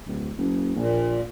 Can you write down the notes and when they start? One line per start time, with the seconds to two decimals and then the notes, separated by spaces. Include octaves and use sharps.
0.07 D1
0.38 F#1
0.76 A#1 A#2